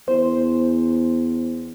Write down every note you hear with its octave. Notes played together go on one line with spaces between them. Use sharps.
E2 C5